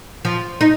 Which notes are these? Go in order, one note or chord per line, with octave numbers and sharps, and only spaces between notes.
F3
D#4